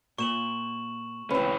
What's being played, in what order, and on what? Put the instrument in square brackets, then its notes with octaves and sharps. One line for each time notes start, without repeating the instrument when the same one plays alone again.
[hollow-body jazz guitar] A#2 [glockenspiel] C#6 E7 F#7
[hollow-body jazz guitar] C#2 C4 [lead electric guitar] E3 C#4 [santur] B4